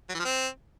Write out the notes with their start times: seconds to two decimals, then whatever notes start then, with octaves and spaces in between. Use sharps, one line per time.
0.09 F#3
0.14 E3
0.19 F3
0.25 C4